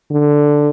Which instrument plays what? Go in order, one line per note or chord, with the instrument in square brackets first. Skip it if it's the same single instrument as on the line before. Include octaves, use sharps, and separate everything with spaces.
[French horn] D3